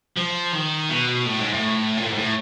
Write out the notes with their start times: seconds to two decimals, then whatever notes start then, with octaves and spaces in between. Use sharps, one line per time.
0.17 F3
0.53 D#3
0.89 B2
1.25 A2
1.39 G#2
1.53 A2
1.97 A#2
2.04 A2
2.11 G#2
2.19 A2